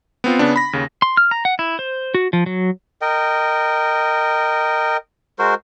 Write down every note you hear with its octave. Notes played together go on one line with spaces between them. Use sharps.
B3 C4 F4
C#3 B3 D4
B5 A#6
D#2 C#3
C6
F6
A#5
F#5
E4
C5
F#4
F3
F#3
A#4 D#5 G5
G#3 F#4 A#4 C5